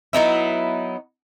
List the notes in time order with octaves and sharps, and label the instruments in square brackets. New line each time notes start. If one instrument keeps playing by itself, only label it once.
[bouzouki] F#3 B3 D#4 E4